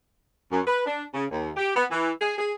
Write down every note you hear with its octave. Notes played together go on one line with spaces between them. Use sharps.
F#2
B4
D4
C#3
D#2
G4
B3
E3
G#4
G#4